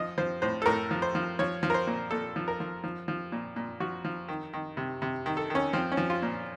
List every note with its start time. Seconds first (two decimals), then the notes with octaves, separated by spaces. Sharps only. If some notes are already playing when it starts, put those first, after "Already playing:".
Already playing: F3 D#5
0.18 F3 C5
0.42 A2 C5
0.62 A4
0.66 A2 A#4
0.91 F3
1.02 C5
1.15 F3
1.39 F3 C#5
1.63 F3
1.70 A#4
1.74 C5
1.87 A#2
2.11 A#2 A4
2.36 F3
2.48 A#4
2.60 F3
2.84 F3
3.08 F3
3.32 A#2
3.56 A#2
3.80 F3 F#4
4.05 F3
4.28 D#3
4.53 D#3
4.77 C3
5.02 C3
5.26 D#3
5.37 A4
5.50 D#3 C#4
5.73 F3 C4
5.92 C#4
5.97 F3
6.10 F4
6.22 A#2